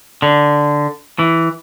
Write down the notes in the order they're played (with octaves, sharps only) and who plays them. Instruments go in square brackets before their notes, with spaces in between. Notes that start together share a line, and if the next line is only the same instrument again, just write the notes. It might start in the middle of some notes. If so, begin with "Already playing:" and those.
[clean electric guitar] D3
E3